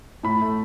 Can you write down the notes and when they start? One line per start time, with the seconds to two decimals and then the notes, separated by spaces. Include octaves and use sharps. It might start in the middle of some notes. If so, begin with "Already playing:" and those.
0.23 A2 B5
0.42 A3